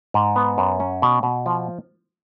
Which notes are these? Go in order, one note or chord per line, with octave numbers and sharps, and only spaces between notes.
G#2
B3
F#2
C#4
B2
B2
F3